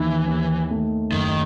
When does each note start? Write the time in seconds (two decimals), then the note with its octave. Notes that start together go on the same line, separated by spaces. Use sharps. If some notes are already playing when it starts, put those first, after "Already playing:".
Already playing: D#2 D#3 E3
0.27 D#2
0.70 A3
1.12 F#1 D#3